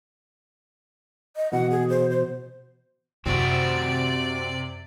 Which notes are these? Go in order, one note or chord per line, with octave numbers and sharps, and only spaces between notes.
D#5
B2 E3 F#5
G#4
C5
C5
F#2 C3 C4 E4 F#4 D5